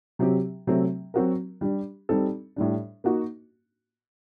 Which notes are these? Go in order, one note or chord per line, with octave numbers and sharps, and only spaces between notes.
C3 F#3 C4 G4
C3 F#3 A3 C4
F#3 C4 F#4 A#4
G3 D4 G4
G3 C4 D#4 A4
A2 G3 D4
A#3 D#4 F#4